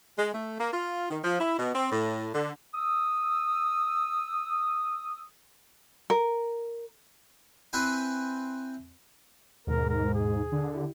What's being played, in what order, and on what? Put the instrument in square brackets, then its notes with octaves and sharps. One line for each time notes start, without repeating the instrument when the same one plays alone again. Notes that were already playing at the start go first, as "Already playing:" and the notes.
[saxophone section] G#3
A3
A#3
F4
D#3
F3
E4
B2
C4
A2
D3
[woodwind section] D#6 E6
[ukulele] A#4
[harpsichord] C4 E4 B4 C5 G#5
[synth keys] D#2 B2 [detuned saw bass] G#2 [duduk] A#4
[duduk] A#4
G#4
[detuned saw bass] D3
[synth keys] E4 G4